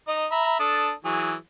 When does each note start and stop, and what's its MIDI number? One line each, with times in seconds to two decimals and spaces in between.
0.08 0.26 63
0.08 0.26 75
0.31 0.56 76
0.31 0.56 82
0.31 0.56 83
0.60 0.91 62
0.60 0.91 69
0.60 0.91 87
1.05 1.34 52
1.05 1.34 54
1.05 1.34 68